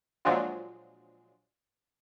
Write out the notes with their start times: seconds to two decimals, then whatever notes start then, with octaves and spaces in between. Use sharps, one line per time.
0.25 A#2 F3 F#3 G#3 D4 F4